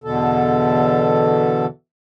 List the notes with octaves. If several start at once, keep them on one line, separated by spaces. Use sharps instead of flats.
E2 B2 D3 A4